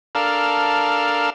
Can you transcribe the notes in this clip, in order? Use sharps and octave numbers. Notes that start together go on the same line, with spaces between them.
D4 A4 A#4 F5